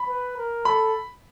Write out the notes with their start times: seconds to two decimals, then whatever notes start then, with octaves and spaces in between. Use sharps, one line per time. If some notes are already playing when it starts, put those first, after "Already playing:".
Already playing: B5
0.08 B4
0.37 A#4
0.65 A4 B5